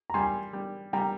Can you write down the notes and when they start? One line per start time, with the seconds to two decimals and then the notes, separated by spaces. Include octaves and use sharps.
0.10 A#5
0.14 G3 G#5 C6
0.53 G3
0.93 G3 G5 A#5